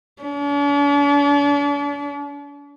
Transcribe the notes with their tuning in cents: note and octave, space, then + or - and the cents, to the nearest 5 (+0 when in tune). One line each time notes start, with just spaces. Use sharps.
D4 -45